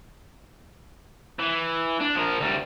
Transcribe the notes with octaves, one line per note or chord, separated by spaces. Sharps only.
E3
D4
F3 A#4
D2 G3